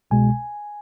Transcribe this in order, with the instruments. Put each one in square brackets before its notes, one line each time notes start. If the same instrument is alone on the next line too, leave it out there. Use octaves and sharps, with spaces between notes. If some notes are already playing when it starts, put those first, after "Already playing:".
[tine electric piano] C2 B2 G#3 G#5